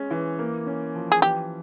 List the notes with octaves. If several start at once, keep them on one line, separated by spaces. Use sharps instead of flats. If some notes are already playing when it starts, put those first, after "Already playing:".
Already playing: G#3 C#4
E3
A#3
C#4
F3
G#4
E3 G4